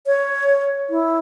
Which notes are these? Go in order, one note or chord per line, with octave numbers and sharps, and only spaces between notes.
C#5
E4